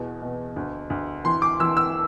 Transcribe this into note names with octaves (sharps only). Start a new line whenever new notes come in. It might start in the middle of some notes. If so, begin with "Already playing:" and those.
Already playing: E2 B2
B2
D2
D2
E3 C6
D6
E3 E6
E6